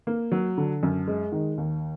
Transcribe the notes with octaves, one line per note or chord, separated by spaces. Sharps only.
A#3
F#3
D3
F#2
G#3
D#3
D#2